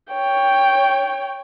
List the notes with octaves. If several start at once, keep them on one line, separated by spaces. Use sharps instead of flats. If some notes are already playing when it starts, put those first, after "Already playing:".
C#5 G5